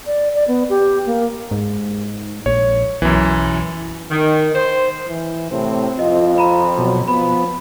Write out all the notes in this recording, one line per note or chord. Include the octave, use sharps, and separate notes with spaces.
D5
D5
B3
G4
A#3
G#2
A#1 C#5
B1 F#2 E3
D#3
C5
E3
A2 C3 C4
F2 F4 D#5
A#5 B5
B2 F#3
F3 B3 B5